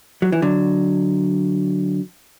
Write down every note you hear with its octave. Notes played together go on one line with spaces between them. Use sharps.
F#3
E3
D3 F#3